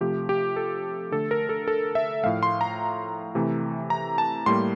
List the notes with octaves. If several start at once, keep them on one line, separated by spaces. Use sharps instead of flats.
C3 F3 A3 G4
G4
A4
D3 A3 A4
A#4
A4
A4
E5
A2 F3 A3 F5
C6
A#5
C3 E3 A3
A#5
A5
A2 G3 A#3 C6